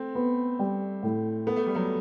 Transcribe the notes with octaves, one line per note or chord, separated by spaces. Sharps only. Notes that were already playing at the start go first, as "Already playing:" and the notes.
Already playing: A3 C4
B3
G3
A2
B3 A4
A3
G3
F#3 A3